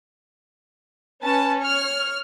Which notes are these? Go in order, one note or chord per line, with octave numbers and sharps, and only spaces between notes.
C#4 B4 A5
C#5 F6